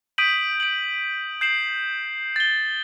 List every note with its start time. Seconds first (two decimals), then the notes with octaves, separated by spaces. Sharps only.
0.18 D#6 G6 B6 D7 D#7 F#7
0.60 D7 F#7
1.41 G6 C7 E7 F#7
2.36 A6 G7